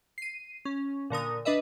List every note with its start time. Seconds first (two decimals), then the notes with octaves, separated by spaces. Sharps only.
0.18 C7 D#7
0.65 C#4
1.10 A#2 D3 A#4 D#6
1.45 D4 B4 D#5 E5